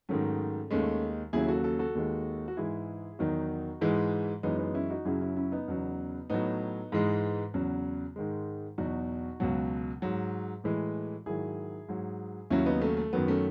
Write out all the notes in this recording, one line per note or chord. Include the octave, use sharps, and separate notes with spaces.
G#2 D#3 F#3 A3 C#4
D#2 D#3 G#3 A3 C#4
D#2 C#3 F#3 E4 G#4
F#4 A4
F#4 A4
F#4 A4
D#2 D#3 G#3
F#4
G#2 E3 G#3 E4 G#4
E2 D#3 F#3 D#4 F#4
G#2 E3 G#3
F#2 E3 G#3 B3 D#4
B3 D#4
C#4 E4
D#4 F#4
F#2 C#3 F#3 E4 G#4
C#4 E4
C#4 E4
B3 D#4
E2 C#3 F#3
A2 F#3 B3 D#4
G#2 E3 G#3
E2 C#3 F#3
G#2 D#3 G#3
E2 B2 F#3 D#4 F#4
C#2 B2 F#3
G#2 F#3
A2 E3 G#3
G#2 D#3 F#3 E4 G#4
G#2 F#3
D#2 C#3 F#3 C#4 E4
B3 D#4
A3 C#4
A3
F#2 D#3 F#3 B3
A3 C#4